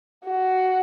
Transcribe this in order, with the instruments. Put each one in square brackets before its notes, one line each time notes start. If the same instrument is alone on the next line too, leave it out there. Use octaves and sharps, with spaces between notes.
[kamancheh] F#4